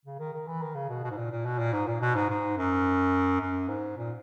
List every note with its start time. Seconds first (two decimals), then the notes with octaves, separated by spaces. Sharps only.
0.05 C#3
0.19 D#3
0.33 D#3
0.47 E3
0.62 D#3
0.75 C#3
0.89 B2
1.03 B2
1.11 G#2
1.17 A#2
1.31 A#2
1.45 B2
1.58 A#2
1.73 G#2
1.87 A#2
2.01 B2
2.15 G#2
2.30 G#2
2.57 F#2
3.41 F#2
3.68 G#2
3.97 A#2